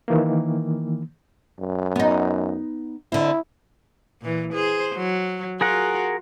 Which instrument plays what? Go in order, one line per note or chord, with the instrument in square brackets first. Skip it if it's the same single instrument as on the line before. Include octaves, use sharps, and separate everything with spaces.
[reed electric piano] D#3 E3 A#3
[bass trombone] F#2
[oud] B3 D#4
[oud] D3 C4 [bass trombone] E4
[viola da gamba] A#2 E3
G#4 C5
F#3
[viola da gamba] F4 F#4 [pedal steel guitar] G#4 A#4 F#5